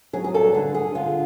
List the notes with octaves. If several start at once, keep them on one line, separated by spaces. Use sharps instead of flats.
F#3 G#4
G#4
G2 A4
D3 G#4
D3 G#4
D3 F4